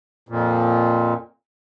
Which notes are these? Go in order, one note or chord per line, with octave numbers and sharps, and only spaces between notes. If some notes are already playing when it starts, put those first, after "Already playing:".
F2 A#2